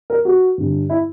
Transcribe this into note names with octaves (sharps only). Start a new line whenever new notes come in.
A#4
F#4
G2 D3
E4